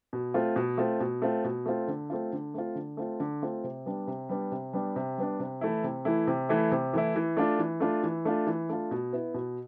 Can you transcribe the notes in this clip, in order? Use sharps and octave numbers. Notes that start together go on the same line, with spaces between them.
B2
A3 C4 F4
B2
A3 C4 F4
B2
A3 C4 F4
B2
A3 C4 F4
D3
A3 C4 F4
D3
A3 C4 F4
D3
A3 C4 F4
D3
A3 C4 F4
C3
G3 B3 D4
C3
G3 B3 D4
C3
G3 B3 D4
C3
G3 B3 D4
C3
E3 A3 E4
C3
E3 A3 E4
C3
E3 A3 E4
C3
E3 A3 E4
E3
A3 D4 F4
E3
A3 D4 F4
E3
A3 D4 F4
E3
A3 D4 F4
B2
B3 E4
B2